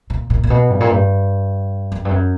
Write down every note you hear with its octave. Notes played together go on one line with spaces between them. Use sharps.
A#2
A#2
A#2
B2
G2
A#2
G2
F#2
G2
F#2